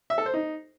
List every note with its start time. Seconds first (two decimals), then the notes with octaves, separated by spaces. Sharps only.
0.10 E5
0.18 A4
0.26 C5
0.34 D#4